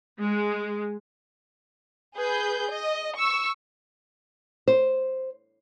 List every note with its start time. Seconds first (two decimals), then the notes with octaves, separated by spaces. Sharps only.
0.21 G#3
2.16 G#4 B4 G6
2.70 D#5
3.16 C#6 E6
4.68 C5